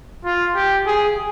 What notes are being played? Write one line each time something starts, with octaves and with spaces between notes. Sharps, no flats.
F4
G4
G#4